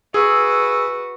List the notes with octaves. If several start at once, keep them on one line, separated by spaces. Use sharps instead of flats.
F#4 G#4 B4 E6